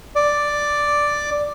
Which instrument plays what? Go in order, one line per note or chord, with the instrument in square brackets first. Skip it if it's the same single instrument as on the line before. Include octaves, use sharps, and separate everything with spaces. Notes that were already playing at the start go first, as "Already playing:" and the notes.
[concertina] D5